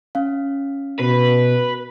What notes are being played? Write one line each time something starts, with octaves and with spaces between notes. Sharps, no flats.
C#4 F5
B2 B4